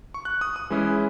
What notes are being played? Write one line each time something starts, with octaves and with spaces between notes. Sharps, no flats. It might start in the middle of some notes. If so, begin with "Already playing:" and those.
C#6
F#6
D#6
D#6
E3 G#3 C#4 E4